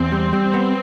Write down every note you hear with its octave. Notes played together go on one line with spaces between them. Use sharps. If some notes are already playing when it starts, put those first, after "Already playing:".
Already playing: E2 C4
G3
G3
B3